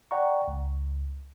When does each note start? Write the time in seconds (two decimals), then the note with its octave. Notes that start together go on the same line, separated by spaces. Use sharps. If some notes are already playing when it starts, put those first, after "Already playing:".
0.11 D5 F#5 G5 A#5 C#6
0.48 C#2